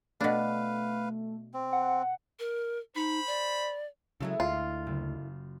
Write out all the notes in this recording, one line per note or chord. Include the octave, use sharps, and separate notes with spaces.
B2 A3 D4 B4 F5
C4
F#5
A#4
D#4 C5 B5
D5
C#3 F3 F#3 G#3 E4 A4
D2 F4 C7
F#1